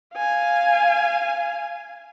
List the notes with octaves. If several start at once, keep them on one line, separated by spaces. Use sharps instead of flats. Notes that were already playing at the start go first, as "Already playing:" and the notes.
F5 G#5